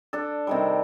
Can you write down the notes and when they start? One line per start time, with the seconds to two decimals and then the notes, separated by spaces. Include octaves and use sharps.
0.13 D4 A4
0.47 C3 D#3 G3